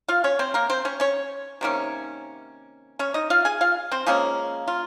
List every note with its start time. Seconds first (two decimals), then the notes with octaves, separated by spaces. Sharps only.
0.08 F4 F5
0.24 C#4 C#5
0.39 C4 C5
0.54 A#3 A#4
0.70 C4 C5
0.85 C#4 C#5
1.00 C#4 C#5
1.61 C3 D#3 A#3 C#4
2.99 C#4 C#5
3.14 D#4 D#5
3.30 F4 F5
3.45 G#4 G#5
3.61 F4 F5
3.91 C4 C5
4.06 F3 G#3 A#3 C#4 G#4
4.68 F4